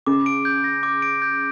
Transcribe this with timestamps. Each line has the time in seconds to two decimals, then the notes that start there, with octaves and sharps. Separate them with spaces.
0.07 C#3 D6
0.26 D7
0.45 G6
0.64 A#6
0.83 D6
1.02 D7
1.22 G6